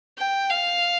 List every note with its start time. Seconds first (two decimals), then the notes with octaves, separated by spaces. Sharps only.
0.18 G5
0.50 F5